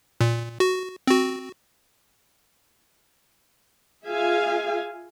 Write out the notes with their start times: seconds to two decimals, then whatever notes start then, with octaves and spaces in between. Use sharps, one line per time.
0.21 A#2
0.60 F#4
1.07 C4 F#4
4.07 F4 G#4 E5 F5 G#5